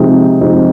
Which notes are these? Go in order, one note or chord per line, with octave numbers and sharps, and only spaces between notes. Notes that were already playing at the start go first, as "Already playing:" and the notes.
Already playing: C3 F3 G#3 C4 D#4
C3 F3 G#3 C4 D#4